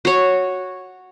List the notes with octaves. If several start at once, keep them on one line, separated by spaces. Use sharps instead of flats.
F#4 C#5